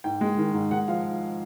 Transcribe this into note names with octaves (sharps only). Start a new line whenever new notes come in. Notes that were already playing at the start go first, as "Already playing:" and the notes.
G#2 G5
G#3
D#3
G#2
G#3 F#5
F3 F5